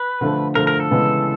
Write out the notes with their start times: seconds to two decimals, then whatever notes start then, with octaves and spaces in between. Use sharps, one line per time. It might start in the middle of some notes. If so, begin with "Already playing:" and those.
Already playing: B4
0.21 D3 F3 A3
0.55 D3 F3 A3 A#4
0.67 A#4
0.80 A4
0.91 C#3 E3 G#3 B3